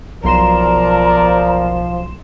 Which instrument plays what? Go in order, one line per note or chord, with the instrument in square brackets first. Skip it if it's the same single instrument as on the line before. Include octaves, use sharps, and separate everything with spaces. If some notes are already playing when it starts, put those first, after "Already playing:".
[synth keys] B1 C6 E7 [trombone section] F3 [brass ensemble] A#4 D5 [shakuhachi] A#5